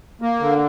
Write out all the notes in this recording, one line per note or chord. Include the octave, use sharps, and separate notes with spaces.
A#3
D3